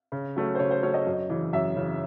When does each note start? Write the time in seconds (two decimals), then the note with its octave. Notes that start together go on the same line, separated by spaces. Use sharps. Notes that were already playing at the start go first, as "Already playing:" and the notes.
0.12 C#3
0.36 F#3 A3 C#4
0.55 C5
0.59 C#3 C#5
0.71 C5
0.82 F#3 A3 C#4 C#5
0.94 D#5
1.07 F#2
1.30 C#3 E3
1.53 F#2 E5
1.76 C#3 E3